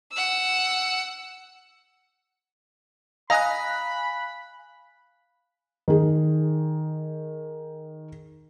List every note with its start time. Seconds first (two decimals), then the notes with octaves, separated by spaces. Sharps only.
0.12 F#5 E6
3.30 D#5 F5 G#5 A#5 B5 F#6
5.88 D#3 G#4